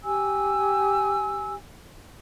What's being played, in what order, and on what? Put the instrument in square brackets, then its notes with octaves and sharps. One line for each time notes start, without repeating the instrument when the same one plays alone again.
[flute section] G4 G#5 E6